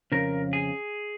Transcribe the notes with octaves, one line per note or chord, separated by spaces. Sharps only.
F2 C#3 A#4
G#4